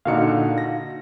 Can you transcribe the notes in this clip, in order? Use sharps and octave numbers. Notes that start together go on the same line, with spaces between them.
A#2 D3 D#4 F#4 F5 C#7
A#6